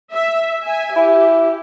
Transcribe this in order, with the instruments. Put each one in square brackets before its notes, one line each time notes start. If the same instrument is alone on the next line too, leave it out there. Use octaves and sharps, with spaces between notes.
[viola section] E5
E5 G#5
[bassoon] E4 [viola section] G4